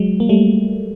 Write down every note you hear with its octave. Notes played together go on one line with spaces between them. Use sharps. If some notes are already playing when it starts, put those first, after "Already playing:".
Already playing: F#3 G#3
A#3
G3 A3